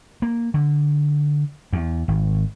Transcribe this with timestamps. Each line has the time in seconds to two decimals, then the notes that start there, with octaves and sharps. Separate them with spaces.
0.22 A#3
0.54 D3
1.73 E2
2.08 G#1